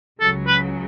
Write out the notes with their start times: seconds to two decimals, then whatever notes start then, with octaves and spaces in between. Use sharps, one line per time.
0.20 C#2 C#3 F#3 A4
0.47 B4